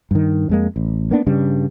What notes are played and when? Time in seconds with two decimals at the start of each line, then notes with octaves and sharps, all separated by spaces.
0.11 G2 D#3
0.49 F2 G#3 A#3
0.76 A1
1.11 A#3 B3 D4
1.26 G2 C#3 G3